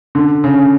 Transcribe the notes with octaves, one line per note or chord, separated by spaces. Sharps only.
D3
C#3